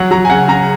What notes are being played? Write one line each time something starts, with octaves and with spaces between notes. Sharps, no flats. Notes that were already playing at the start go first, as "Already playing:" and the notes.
Already playing: F#3 F#5
F#3 A#5
G#5
C#3 F#5
C#3 A#5